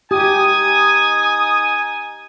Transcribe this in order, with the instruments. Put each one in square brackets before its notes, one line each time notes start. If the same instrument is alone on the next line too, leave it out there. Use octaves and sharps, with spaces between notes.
[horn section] D#4 G#5 [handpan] G4 [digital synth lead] D#6